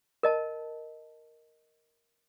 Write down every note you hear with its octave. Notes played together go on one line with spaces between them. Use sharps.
A#4 D#5 A5